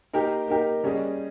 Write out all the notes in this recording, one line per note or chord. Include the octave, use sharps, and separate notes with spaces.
A#3 D#4 G4 A#4
A#3 D#4 G4 A#4
G3 C#4 G#4 D#5